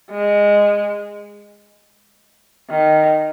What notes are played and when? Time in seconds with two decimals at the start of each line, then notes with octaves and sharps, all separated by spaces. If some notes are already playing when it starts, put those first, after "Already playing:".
0.11 G#3
2.70 D#3